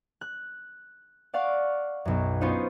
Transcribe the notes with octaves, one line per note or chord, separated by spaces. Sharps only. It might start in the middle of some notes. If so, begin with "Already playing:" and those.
F#6
D5 F5 F#5 C#6
B1 F#2
B3 C#4 D#4 F4 C5 C#5